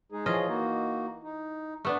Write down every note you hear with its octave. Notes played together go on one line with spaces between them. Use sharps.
G#3 D#4 G#4
E3 F3 F4 G#4 C#5 D#5
A#3 D#4 F#4
D#4
A3 B3 D4